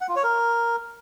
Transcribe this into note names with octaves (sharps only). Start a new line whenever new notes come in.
F#5
F4
C#5
A#4